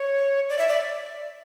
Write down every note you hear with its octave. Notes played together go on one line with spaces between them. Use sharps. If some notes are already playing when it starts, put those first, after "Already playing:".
Already playing: C#5
D5
E5
D5